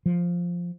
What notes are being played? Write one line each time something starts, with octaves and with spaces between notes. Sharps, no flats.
F3